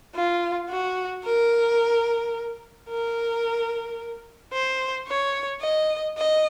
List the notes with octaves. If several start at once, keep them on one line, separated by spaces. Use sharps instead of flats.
F4
F#4
A#4
A#4
C5
C#5
D#5
D#5